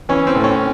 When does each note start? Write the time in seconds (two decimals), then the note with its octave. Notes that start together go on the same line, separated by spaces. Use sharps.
0.09 E3 C#4
0.27 C4
0.35 A2
0.44 C#4